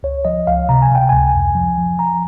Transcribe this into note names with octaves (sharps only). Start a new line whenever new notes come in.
C#2 C#5
F3 D#5
C#2 F5
C3 A#5
G#5
C3 G5
C#2 G#5
F2
F3
F3
F3 A#5